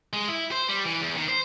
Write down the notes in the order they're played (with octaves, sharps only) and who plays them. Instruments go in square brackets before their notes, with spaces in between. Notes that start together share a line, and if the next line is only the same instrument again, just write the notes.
[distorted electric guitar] G#3
E4
C5
G3
E3
E2
D#3
C5